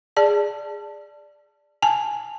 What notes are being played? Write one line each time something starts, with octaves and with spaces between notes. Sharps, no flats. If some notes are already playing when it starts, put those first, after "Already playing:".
G#4 D5 A5
G#5 A5